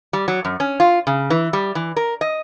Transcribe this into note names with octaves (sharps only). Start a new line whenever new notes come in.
G3
F#3
F#2
C#4
F4
C#3
E3
G3
E3
A#4
D#5